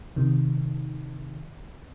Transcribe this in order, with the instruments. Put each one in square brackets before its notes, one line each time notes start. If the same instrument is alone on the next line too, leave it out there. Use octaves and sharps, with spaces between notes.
[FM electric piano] C3 D#3